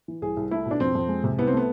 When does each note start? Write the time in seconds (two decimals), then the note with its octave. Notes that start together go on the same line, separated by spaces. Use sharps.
0.08 E3
0.22 C2 G#4
0.37 C2
0.51 A3 E4
0.66 B2 D4
0.80 F2 C4
0.95 F2
1.08 G#3
1.24 C3
1.38 C2 B3
1.47 C4
1.53 A3 B3